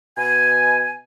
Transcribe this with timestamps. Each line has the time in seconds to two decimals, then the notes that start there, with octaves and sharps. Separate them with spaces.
0.17 B2 G#5